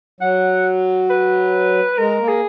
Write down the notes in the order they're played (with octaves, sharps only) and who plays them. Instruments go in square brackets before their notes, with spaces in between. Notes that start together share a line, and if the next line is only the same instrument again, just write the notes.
[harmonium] F#3 [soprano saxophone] F#5
[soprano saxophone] B4
[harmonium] G#3 [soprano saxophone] A#4
[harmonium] A#3
[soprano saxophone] G#4